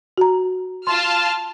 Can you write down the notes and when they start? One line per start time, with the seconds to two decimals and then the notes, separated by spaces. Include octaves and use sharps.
0.18 F#4 A#5
0.87 F4 A5 C6 F6